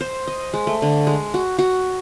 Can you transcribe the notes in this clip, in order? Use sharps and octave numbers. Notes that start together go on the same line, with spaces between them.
C5
D#5
G#3
A3
D3
G#3
F#4
F#4